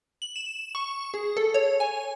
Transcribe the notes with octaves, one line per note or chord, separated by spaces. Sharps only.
F#7
E7
C#6
G#4
A4
C#5
G#5